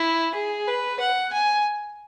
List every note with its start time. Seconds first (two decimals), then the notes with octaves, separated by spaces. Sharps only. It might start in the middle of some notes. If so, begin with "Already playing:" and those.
Already playing: E4
0.35 G#4
0.67 B4
1.00 F#5
1.33 G#5